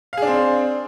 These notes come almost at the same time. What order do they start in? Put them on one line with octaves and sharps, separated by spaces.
F5 G#4 D4 C4